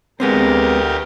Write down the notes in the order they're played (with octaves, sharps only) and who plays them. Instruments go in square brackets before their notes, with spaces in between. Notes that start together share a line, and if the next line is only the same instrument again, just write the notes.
[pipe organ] D2 G4 A#4 [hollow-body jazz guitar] G#3 B3 C4